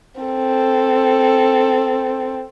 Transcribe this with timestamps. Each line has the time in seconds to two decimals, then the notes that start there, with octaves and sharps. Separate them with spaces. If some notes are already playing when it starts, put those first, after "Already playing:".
0.21 C4 A4